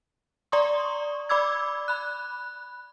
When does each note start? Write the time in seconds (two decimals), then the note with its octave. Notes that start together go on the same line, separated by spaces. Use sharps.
0.52 D5 A#5 C6 C#6 D#6
1.29 D5 B5 D6 E6 G#6
1.88 B5 F#6